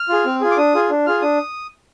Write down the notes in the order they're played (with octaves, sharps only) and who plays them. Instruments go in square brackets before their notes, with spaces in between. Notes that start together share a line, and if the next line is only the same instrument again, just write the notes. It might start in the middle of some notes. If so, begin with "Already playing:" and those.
Already playing: [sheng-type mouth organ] F6
F4 G#4
C4
F4 G#4
D6
D4 D#6
F4 G#4
D4
F4 G#4 F6
D4 D#6